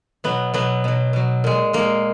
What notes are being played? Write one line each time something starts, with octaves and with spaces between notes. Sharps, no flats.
B2 F#3 B3
B2 F#3 B3
B2 F#3
B2 F#3
A#2 G#3
A#2 G#3 A#3